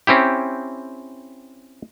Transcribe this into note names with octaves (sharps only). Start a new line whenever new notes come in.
C4 C#4 E4 G4